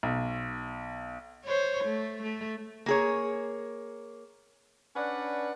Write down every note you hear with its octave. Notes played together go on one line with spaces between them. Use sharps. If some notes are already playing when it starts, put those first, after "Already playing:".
B1
C5 C#5
A3
A3
A#3 G#4 C#5
C#4 D4 B4 D5 F#5